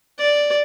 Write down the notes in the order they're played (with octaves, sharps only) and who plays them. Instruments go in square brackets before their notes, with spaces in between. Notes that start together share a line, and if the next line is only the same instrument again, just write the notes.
[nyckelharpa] D5